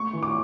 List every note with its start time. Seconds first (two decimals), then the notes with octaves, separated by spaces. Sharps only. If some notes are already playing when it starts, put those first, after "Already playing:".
Already playing: A3 C#6
0.13 E3
0.23 D6